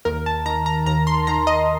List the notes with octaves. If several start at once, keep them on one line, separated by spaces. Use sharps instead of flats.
D#2 A#4
A5
D#3 A#5
A#5
D#2 A#5
C6
D#3 A#5
D#5